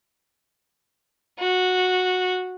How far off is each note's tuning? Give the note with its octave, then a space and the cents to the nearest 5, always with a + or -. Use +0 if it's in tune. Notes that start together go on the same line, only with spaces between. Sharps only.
F#4 -10